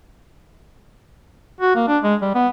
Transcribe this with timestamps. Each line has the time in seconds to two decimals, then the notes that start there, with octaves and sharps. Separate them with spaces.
1.61 F#4
1.75 A#3
1.88 D4
2.03 G#3
2.22 G3
2.35 B3